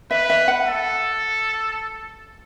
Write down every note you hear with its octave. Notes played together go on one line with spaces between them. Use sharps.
B4 E5
E5
F#5
A4